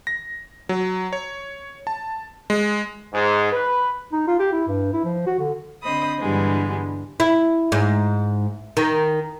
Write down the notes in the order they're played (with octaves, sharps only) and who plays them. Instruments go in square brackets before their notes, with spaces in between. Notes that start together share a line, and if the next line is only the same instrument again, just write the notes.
[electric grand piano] A#6
F#3
C#5
A5
G#3
[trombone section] G#2
B4
[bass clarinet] D#4
F4
G4
E4
G2
E4
F3
F#4
D3
[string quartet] D3 C4 C5 D#5 B5 D#6
G2 D3 E3 G3 G#3 B3
[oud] E4
G#2
D#3